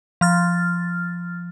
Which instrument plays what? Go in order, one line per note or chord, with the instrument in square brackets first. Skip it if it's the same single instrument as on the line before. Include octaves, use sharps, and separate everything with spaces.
[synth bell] F3 F6 A6